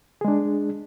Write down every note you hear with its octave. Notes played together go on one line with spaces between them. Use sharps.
G#3 D4 G#4